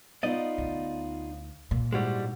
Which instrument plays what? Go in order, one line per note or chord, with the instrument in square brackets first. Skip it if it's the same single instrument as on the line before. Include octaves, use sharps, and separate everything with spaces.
[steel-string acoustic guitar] B3 D#4 F4 [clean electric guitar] D5 D#5
[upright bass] D2
A#2
[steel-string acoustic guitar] G#2 E4 F#4 [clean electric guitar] G3 G#3